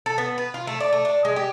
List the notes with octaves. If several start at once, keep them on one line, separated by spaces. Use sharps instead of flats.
A4
B3
B4
F4
A3
D5
A3
D4
G#3
G4